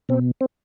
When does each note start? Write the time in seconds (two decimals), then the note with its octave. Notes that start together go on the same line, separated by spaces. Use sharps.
0.09 B2 C4
0.41 C4